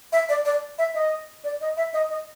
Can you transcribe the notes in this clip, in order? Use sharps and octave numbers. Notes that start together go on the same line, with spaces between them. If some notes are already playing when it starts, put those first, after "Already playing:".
E5
D5
D5
E5
D#5
D5
D#5
E5
D#5
D#5